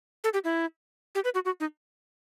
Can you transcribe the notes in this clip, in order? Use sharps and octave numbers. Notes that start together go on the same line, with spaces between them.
A4
G4
E4
G4
B4
F#4
F#4
D#4